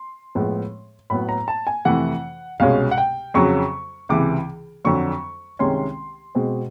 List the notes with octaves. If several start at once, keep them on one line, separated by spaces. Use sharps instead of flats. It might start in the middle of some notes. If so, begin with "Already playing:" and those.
Already playing: C6
A2 F3 G#3 B3
A2 F#3 B3 B5
A#5
A5
G#5
F2 C3 E3 A3 F#5
C2 B2 G#3 C#4 F5
F#5
G5
F2 C#3 F#3 C#6
C#2 C3 E3 D6
F2 D3 F#3 C#6
C2 C3 D#3 G#3 C#4 C6
B2 G#3 C4